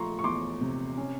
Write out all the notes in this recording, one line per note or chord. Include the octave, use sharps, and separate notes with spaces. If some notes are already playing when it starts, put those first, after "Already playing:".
Already playing: F3 A3 A#5 C6 C#6
C#6
E2 C6 D6
C3
C#4